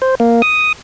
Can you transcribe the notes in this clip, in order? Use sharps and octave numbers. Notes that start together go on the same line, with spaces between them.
C5
A#3
D#6